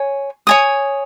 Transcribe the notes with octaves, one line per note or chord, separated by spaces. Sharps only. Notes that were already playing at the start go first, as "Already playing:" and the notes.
Already playing: C#5 G#5
C#5 G#5 D#6